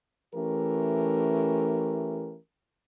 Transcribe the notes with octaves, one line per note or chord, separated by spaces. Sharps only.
E3 A3 C#4 G4 A#4